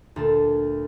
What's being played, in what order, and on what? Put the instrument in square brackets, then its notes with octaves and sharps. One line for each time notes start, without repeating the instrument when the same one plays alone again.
[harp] D2 A#2 A5